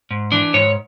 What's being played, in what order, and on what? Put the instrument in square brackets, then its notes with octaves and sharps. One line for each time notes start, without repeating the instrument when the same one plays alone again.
[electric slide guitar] G#2
E3 D4
G#2 C#5